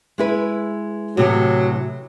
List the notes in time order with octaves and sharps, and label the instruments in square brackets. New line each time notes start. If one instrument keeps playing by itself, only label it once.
[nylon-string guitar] G#3 E4 B4
[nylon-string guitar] A2 C3 E3 [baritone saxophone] F#3